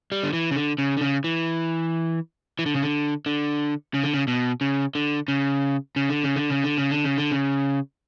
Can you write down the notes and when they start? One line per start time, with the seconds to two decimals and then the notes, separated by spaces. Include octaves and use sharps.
0.12 G3
0.23 D3
0.33 E3
0.51 C#3
0.56 D3
0.78 C#3
0.97 D3
1.01 C#3
1.24 E3
2.59 E3
2.66 D3
2.75 C#3
2.82 D3
3.26 D3
3.94 C#3
4.04 D3
4.14 C#3
4.28 B2
4.61 C#3
4.95 D3
5.28 C#3
5.96 C#3
6.10 D3
6.24 C#3
6.36 D3
6.50 C#3
6.64 D3
6.77 C#3
6.90 D3
7.04 C#3
7.18 D3
7.32 C#3